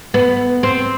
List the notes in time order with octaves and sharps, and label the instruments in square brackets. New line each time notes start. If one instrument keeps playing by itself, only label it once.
[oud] B3
C4